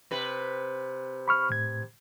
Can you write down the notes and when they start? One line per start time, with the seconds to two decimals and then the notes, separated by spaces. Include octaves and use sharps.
0.11 C3 B4
1.28 B5 C#6 F6
1.50 A2 G#6